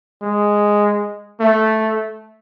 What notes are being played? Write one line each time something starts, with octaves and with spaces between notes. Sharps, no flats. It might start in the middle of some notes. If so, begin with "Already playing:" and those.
G#3
A3